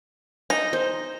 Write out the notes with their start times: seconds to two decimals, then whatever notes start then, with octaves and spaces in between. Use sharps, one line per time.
0.50 D#4 A#6
0.73 C5